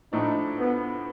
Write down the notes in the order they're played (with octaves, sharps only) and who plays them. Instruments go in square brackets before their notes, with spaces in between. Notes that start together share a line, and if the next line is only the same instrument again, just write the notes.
[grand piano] A2 F3 A3 D4 [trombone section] D#4
[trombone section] B3